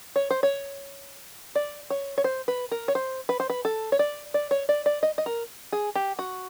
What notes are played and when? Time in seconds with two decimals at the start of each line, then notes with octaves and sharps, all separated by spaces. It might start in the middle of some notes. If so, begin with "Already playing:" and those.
0.16 C#5
0.31 C5
0.43 C#5
1.55 D5
1.90 C#5
2.18 C#5
2.24 C5
2.48 B4
2.71 A#4
2.88 C#5
2.95 C5
3.29 B4
3.40 C5
3.50 B4
3.65 A4
3.92 C#5
3.99 D5
4.34 D5
4.51 C#5
4.69 D5
4.86 D5
5.03 D#5
5.18 D#5
5.26 A#4
5.73 G#4
5.95 G4
6.19 F#4